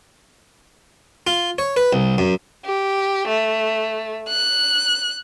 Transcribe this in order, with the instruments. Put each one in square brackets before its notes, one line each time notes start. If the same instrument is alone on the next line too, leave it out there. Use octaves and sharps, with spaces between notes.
[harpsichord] F4
C#5
B4
C2
F#2
[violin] G4
A3
F#6